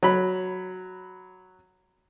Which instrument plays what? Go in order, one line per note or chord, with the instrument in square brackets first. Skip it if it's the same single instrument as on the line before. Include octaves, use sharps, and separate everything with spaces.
[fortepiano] F#3 B5